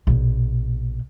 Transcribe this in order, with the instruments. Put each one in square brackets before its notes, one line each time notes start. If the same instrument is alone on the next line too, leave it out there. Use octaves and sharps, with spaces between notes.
[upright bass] A#1 B2